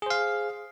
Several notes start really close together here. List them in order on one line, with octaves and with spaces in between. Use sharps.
G#4 C5 F5